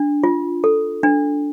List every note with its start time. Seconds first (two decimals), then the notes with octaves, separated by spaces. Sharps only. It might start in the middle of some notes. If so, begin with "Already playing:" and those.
Already playing: D4
0.23 F4
0.64 A4
1.03 D4